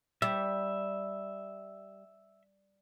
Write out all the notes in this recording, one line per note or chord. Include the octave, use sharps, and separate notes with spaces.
G3 E5